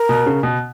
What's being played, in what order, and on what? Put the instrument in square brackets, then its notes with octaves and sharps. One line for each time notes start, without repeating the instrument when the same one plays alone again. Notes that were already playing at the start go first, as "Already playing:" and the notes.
Already playing: [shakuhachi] A#4
[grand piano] B2
C#3
B2